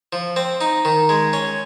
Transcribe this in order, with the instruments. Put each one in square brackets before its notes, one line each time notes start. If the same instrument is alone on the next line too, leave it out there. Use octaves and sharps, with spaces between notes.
[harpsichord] F3
C4
D#4
D#3
G#3
C#4